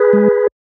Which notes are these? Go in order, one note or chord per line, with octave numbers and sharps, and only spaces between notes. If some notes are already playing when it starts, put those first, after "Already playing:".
Already playing: G#4 B4
G#3